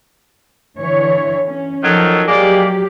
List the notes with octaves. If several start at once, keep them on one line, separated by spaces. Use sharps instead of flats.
D3 E3 C#5
C#4
D#3 F3 F#3 A4
F#3 G#3 A#3 G4 D5